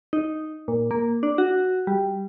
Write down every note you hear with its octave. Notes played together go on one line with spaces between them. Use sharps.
D#4
A#2
A#3
D4
F#4
G3